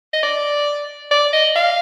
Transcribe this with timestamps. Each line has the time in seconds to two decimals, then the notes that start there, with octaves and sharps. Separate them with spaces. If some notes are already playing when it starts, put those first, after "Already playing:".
0.13 D#5
0.23 D5
1.11 D5
1.33 D#5
1.56 F5